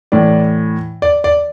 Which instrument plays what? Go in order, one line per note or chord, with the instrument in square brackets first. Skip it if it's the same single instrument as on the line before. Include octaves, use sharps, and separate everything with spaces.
[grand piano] A2 E3 D5
D5
D5